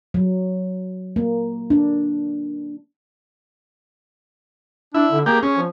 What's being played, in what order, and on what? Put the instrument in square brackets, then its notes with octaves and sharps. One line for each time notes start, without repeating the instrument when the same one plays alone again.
[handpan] F#3
A#3
D4
[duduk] D4 [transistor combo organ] E4
[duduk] D3
[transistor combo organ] A#3 G4 [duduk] G#4
[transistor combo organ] C#4
[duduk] F3